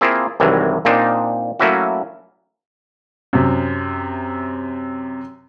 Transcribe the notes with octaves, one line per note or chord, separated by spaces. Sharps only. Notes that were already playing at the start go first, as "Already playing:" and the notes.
A#3 C4 E4 F4 G#4
C2 G2 D#3 E3 F#3 G#3
A#2 A#3 C4 D4 D#4
F#3 A3 A#3 C#4 E4 F#4
F#2 C3